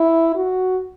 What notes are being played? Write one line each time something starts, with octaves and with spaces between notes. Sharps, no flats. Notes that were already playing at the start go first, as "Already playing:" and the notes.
Already playing: E4
F#4